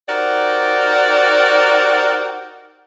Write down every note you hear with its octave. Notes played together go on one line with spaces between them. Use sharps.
D#4 F#4 G4 A#4 C5 D5